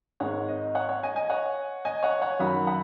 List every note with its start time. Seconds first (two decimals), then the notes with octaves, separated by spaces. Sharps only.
0.20 G#1 G#2 G#3 C#5 F#5
0.48 D#5
0.75 C#5 F#5
0.89 C#5 F#5
1.03 D#5 G#5
1.16 D#5 G#5
1.30 C#5 F#5
1.85 D#5 G#5
2.03 C#5 F#5
2.22 C#5 F#5
2.39 F#2 D#3 F#3 F#5 B5
2.67 F#5 B5